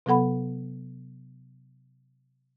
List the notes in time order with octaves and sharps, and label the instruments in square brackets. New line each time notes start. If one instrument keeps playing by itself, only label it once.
[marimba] C3 F#3 B3 A4 F#5 B5